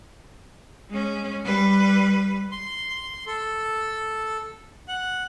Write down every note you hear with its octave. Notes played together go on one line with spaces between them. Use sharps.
G#3 C#4
G3 B4
C6
A4
F#5